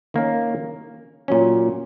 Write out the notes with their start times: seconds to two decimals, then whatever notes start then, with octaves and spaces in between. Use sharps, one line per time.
0.14 D#3 A#3 C#4
1.28 A#2 F#3 C#4